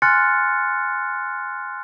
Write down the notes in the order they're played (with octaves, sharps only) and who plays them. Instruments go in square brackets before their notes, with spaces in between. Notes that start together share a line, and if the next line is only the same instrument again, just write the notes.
[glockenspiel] G#5 C6 F6 F#6 A6 C#7